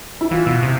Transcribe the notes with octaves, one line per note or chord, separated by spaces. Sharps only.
E4
E3 F4
B2
C3